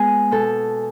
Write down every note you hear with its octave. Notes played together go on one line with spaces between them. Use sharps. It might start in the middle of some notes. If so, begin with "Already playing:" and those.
Already playing: G#3 B3 G#4
B2 A4